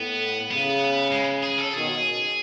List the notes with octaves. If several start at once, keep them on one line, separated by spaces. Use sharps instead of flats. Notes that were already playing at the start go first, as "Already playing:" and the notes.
Already playing: A2 B3
C#3 B3
G#3
G#4
A4
B2 D#3 G#4